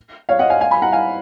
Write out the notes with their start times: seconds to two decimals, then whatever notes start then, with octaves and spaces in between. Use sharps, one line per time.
0.29 C#5 F5
0.39 D#5 F#5
0.50 F5 G#5
0.61 F5 G#5
0.71 G#5 B5
0.82 F#5 A#5
0.92 F5 G#5